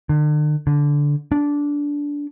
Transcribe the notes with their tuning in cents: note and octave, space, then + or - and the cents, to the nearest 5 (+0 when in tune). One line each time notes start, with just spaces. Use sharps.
D3 +40
D3 -10
D4 -15